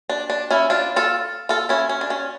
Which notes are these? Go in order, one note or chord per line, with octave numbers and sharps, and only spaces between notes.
D4
D4
C#4 E4
D4 F4
F4 A4
F4 A4
C#4 E4
C#4
D4
C#4